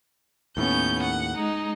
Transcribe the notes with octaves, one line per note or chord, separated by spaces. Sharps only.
D#2 A2 B3 C#4 G6
F#5
G#3 D#4